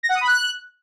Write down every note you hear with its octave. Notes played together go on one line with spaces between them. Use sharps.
A#6
F#5
D#6
B5
F#6